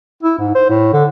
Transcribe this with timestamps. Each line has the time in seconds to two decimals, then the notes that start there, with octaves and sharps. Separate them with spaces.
0.23 E4
0.38 G#2
0.55 C5
0.70 A2
0.93 D3